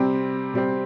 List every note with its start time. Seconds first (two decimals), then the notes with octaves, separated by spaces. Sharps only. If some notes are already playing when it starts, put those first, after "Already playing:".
Already playing: C3 G3 C4
0.54 C3 G3 C4